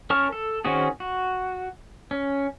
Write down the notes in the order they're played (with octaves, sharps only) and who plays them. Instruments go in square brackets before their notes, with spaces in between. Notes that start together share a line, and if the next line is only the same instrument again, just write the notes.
[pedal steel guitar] C#4 A#4 A5 C#6 F6
A4
D#3 C4 C#4 F#4 G#4
F#4
C#4